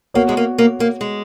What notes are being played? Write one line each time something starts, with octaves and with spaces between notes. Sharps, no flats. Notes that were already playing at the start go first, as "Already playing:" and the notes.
A#3 B3 F#4 C#5
G#3
A#3
A#3
A#3
G#3